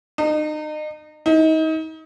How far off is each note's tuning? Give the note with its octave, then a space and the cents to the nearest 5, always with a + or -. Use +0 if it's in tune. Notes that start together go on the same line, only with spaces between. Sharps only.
D#4 -35
D#4 +30